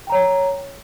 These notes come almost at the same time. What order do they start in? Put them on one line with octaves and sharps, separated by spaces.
G5 A#5 C#5